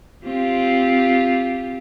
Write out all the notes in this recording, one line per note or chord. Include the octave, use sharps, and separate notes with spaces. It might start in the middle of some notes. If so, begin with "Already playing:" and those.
C4 F4 G4